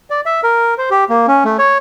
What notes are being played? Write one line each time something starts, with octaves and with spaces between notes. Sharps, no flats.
D5
E5
A#4
C5
G4
A#3
C#4
A3
C#5